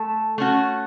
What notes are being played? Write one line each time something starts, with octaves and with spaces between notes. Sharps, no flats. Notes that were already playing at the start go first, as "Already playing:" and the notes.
Already playing: A3 A4
A3 C#4 F#4